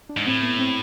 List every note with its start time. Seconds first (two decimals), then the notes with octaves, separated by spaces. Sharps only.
0.09 D4
0.17 G#2
0.27 A2 C4
0.43 B3
0.59 C4